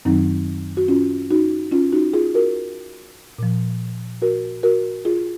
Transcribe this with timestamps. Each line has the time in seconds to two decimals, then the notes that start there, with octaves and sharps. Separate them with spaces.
0.05 F#2 D#3 F#3 C4 D#4
0.77 F#4
0.88 C#4 F4
1.31 D#4 F#4
1.71 C#4 F4
1.92 D#4 F#4
2.14 F4 G#4
2.34 F#4 A#4
3.38 A#2 F3
4.22 F#4 A#4
4.63 F#4 A#4
5.05 F4 G#4